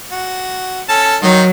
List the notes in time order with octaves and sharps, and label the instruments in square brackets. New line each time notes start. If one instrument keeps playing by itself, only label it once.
[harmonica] F#4
C#4 A4 A5
[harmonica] D#3 D#4 [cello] F#3